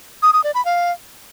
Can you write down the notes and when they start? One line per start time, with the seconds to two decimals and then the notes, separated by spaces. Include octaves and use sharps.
0.23 D#6
0.33 D#6
0.44 D5
0.55 B5
0.65 F5